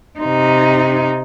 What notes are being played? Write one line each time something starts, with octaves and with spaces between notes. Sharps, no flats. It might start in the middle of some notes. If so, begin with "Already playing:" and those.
C3 D#4